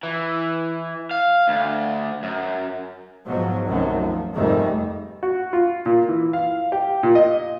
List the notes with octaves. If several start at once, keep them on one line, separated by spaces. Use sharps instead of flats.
E3
F5
D2
F#2
G#2 B2 F3 F#3
C2 F#2 D#3 F#3 A3
F3
F1 F2 G#2 D#3 G3 A3
F#4
F4
A#2
E3
F5
G4
A#2
D#5